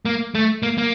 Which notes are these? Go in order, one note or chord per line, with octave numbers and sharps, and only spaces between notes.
A#3
A3
A#3
A#3